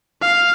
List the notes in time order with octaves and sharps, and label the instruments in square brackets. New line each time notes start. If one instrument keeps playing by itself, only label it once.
[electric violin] F5